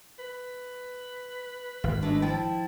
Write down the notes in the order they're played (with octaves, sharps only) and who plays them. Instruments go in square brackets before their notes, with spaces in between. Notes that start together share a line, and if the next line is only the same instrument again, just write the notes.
[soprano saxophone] B4
[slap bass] G#1
[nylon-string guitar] G#3 A3 D4
[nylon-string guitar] F3 E4 G5 [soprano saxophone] A5